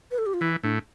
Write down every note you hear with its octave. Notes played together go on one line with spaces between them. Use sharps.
B4
A4
G4
F4
E3 E4
A2 D4